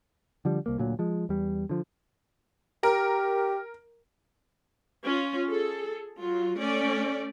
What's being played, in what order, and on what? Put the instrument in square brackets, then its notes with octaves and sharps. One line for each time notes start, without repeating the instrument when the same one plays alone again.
[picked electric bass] D3 F3 G3
C2 A#3
D2 A#2 F#3
F3 G#3
E2 G3
D3 F3
[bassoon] G4 [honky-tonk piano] A#4
[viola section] C#4 F4
G#4 A4
F#3 F4
A3 C#4 D5